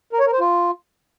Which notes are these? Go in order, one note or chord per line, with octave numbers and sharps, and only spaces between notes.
A#4
C#5
A#4
C5
F4